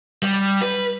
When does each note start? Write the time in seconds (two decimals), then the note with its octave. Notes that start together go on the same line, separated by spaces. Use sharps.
0.23 G3
0.62 B4